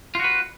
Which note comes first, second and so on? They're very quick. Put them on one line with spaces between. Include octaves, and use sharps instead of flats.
F4 F#4 B4